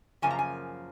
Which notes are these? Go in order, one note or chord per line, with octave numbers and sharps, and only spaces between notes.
F#2 C#3 F3 A#3 G#5
A#5
G#5